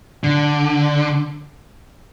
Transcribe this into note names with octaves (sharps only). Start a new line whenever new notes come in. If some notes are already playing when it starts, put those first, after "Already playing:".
D3